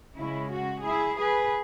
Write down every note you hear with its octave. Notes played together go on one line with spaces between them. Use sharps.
C#3 G#3 C#4 E4
F#4
E4 G#4
G#4 B4